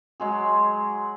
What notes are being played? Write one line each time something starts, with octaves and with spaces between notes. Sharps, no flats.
F#3 G#3 G#4